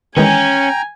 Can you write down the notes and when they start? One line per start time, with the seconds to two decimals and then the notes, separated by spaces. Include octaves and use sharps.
0.17 D#3 E3 G#3 C#4 G5 G#5 A#5